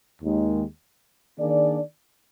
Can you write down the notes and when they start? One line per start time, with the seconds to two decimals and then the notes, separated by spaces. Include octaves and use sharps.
0.22 D#2 D#3 G#3
1.38 D#3 A#3 D4 G#4 D5